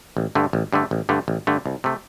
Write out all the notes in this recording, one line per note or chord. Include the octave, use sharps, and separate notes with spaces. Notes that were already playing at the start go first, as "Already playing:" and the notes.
A1
G2 D3 A3
A1
G2 D3 A3
A1
G2 D3 A3
A1
G2 D3 A3
C2
C3 A3